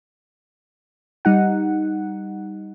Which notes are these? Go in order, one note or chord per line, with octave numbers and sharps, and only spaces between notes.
G3 D#4 F#5